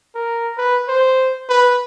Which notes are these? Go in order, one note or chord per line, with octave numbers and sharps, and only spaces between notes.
A#4
B4
C5
B4